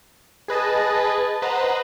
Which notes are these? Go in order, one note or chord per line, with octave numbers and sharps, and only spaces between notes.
G#4 B4 D#5 A5
B4 C5 D#5 F#5 A#5